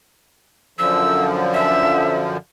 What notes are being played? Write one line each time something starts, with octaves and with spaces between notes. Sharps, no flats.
F#2 D3 F3 E6
E5